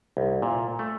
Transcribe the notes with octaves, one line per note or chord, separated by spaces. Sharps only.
C2
A#2
A3